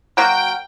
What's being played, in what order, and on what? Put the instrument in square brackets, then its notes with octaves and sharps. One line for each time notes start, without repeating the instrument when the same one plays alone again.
[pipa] F#3 A#3 F#4 A#4 [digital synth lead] G5